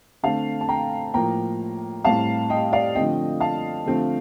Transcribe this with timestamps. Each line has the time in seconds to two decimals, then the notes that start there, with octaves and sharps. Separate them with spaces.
0.23 D3 A3 C4 F5 A5
0.61 A5
0.69 G5 A#5
1.14 A2 F3 A#3 G5 A#5
2.04 A2 G3 C4 F5 A5
2.50 D#5 G5
2.73 D5 F5
2.95 D3 F3 A3 C4 D#5 G5
3.40 F5 A5
3.86 D3 F3 A3 C4